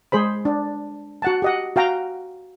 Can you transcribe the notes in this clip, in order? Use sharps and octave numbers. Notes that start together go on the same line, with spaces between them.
G#3 G#4 C5 B5
D4
F#4 F#5 A5
G4 D#5 F#5
F#4 F5 G5 A#5